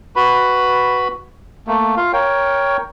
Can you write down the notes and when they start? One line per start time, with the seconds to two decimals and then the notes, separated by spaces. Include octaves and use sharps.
0.16 F#4 B4 B5
1.67 A3 A#3
1.97 F4 F5
2.13 A#4 C#5 G5